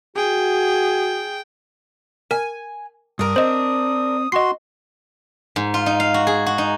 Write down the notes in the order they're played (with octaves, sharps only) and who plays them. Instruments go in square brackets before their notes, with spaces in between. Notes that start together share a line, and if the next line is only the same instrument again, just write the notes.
[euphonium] F#4 [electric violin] G#4 [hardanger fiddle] G5
[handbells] A#4 [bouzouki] G#5
[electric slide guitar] G2 [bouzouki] D4 A#4 [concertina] D#6
[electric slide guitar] C4 [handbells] C5 D#5
[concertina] F#4 C6 [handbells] D#5 C7
[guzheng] G#2
F4
D#4
F5
F#4
G#4
F#4
D#4